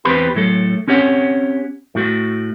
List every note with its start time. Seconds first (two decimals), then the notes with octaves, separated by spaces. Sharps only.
0.05 E2 C4 G4 B4 C5 B5
0.35 A2 F#3 A4
0.88 C4 C#4 G4 C#5 F#5
1.95 A2 A3 F#4